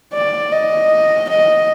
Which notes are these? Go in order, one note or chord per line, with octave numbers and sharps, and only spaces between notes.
D5
D#5
D#5